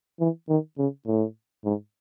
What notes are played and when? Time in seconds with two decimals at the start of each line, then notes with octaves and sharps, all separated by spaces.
0.20 E3
0.49 D#3
0.78 C#3
1.07 A2
1.65 G#2